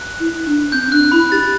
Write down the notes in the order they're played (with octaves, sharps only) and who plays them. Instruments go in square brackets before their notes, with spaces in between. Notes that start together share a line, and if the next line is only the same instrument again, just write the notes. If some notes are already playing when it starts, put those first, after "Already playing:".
Already playing: [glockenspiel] F#6
[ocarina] E4
D4
[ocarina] C4 [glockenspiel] G6
[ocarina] D4 [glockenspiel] F#6
[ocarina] E4 [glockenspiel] B5
[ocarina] G4 [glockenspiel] A6